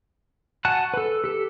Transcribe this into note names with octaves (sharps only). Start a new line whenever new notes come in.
F#4 F#5 G#5 A5 F#6
A4 B4
G4 A4